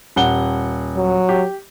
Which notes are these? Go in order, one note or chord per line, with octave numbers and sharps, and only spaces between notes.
D#1 F#5 G7
F#3
G4